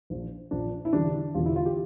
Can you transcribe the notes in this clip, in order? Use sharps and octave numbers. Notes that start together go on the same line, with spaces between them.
A#1 A#2 F3
A#1 A#2 F3 D4
E4
E1 E2 D3 G3 D4
E1 E2 D3 G3 F4
E4
F4
G4